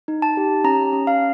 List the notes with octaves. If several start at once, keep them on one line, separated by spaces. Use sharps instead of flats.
D#4
A5
G4
C#4 A#5
C#4
F5